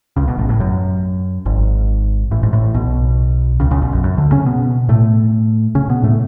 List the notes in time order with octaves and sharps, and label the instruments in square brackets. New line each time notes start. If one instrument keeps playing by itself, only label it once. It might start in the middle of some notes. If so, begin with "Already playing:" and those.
[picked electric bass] C#2 C#3
B1 B2
A1 A2
A1 A2
F#2
G#1 G#2
A1 A2
G#2
A1 A2
B1 B2
C#2 C#3
C#2 C#3
B1 B2
F#2
F#2
D2 D3
C#3 C#4
B2 B3
A2 A3
C#3 C#4
B2 B3
A2 A3